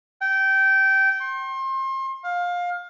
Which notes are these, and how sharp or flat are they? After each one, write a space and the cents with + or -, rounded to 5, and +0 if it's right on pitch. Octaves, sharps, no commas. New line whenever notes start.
G5 -20
C6 +35
F5 +20